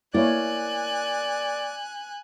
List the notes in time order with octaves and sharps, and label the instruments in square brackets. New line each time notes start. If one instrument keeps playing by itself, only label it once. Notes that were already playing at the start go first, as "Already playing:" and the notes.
[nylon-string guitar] A#3 [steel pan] E4 C#5 [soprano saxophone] D5 [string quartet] G#5 F#6